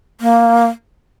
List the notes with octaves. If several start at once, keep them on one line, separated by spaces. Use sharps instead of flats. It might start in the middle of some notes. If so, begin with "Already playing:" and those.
A#3